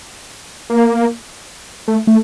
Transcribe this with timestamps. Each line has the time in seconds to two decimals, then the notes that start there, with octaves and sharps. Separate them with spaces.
0.70 A#3
1.88 A3
2.07 A3